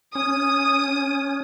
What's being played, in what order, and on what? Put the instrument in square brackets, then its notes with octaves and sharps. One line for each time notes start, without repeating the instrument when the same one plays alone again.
[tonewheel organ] C#4 [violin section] D#6